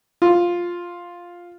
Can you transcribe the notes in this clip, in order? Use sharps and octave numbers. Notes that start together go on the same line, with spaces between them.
F4